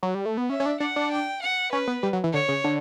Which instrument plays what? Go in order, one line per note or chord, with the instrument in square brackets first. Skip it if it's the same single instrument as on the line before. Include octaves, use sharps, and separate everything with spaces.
[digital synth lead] F#3
G3
A3
B3
[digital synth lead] C#4 [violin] E5
[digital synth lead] C#4
D4
[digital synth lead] D4 [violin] F#5
[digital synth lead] D4
[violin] G5
F#5
[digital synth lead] C#4 [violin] B4
[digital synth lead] B3
G3
F#3
E3
[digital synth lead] D3 [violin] C#5
[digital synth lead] C#3
D3